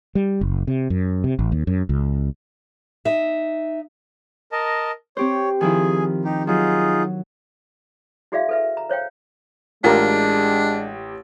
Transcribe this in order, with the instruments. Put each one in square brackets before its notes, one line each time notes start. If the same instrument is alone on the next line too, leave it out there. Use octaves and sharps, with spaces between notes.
[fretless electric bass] G3
F#1
C3
F#2
C3
A1
D#2
F#2
C#2
[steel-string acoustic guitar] D#4 E5
[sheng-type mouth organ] A#4 D#5 A5
[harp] C4 G4 C5 [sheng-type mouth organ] C#5
[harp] D#3 F3 E4 [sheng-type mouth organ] G#4 G#5
[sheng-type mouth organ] D#4 G4
[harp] F#3 [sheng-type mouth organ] D#4 F4 G#4
[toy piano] E4 F#4 G#4 D5 E5 F5
A4 B4 E5
A#5
C5 C#5 F5 G5
[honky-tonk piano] A1 G4 [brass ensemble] G#3 [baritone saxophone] D4 [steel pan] F4 A#4